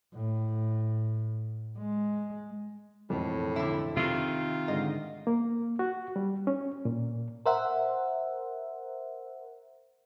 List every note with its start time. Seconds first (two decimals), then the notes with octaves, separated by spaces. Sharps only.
0.14 A2
1.78 G#3
3.10 E1 F2 A2
3.56 D3 E4
3.97 C3 D#3 F4
4.68 G#2 D3 D#5
5.27 A#3
5.79 F#4
6.16 G3
6.47 C#4
6.85 A#2
7.46 A#4 C5 E5 F#5